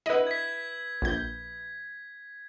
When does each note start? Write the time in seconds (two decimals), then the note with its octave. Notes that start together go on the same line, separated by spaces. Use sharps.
0.06 E4 B4 D#5 F#5
0.27 G#6 B6
1.02 A#1 G6